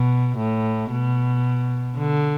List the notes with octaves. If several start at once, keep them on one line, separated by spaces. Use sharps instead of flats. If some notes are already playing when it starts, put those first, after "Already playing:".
Already playing: B2
A2
B2
D3